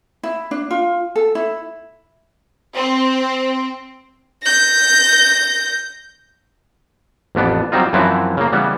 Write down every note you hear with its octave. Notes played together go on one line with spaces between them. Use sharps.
E4
D4
F4
A4
E4
C4
G6 A#6
A1 F2 B3 D4
F#3 G3 C4 D#4 F4
F#2 E3 F3 C4 E4 F#4
C#3 A#3
C#3 E3 G3 B3